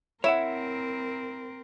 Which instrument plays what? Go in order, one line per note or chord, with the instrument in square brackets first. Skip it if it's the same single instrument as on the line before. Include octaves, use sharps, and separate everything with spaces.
[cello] C4 A#4 [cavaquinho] E4 [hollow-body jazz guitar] C#5 E5 F#5